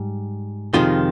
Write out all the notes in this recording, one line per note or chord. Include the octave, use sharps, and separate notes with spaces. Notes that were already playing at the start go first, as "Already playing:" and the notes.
Already playing: G#2 G3
F2 C3 D#3 G#3 F4